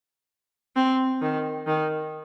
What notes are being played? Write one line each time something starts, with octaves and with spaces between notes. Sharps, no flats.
C4
D#3
D#3